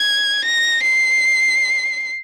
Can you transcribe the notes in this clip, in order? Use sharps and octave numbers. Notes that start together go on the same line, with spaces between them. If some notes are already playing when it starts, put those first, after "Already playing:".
Already playing: G#6
A#6
C7